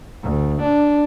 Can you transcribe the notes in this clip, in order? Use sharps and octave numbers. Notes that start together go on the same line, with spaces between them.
D2
D4